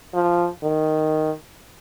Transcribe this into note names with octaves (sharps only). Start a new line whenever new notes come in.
F3
D#3